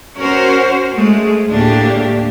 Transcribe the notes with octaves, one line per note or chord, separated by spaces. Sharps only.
C#4 F#4 A#4 C5
G#3 A3
D2 A2 A#3 D4 G4